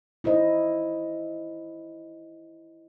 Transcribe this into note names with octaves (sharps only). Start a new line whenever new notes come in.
D#4 E4 C5 D#5